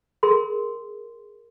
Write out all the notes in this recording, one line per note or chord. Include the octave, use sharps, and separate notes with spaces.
G#4 A#4 C6